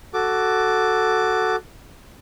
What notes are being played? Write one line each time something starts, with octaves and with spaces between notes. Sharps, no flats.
F#4 A4 D6